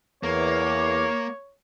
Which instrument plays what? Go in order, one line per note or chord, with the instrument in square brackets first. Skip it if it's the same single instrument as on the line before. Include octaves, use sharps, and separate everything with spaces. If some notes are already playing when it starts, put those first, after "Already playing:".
[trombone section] E2 [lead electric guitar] A#3 [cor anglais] C#5